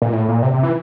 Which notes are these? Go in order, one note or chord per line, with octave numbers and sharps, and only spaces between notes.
A#2
A2
A#2
C3
C3
E3